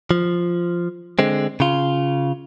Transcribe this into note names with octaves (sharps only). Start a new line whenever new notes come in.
F3
D3 G#3 C4
C#3 F4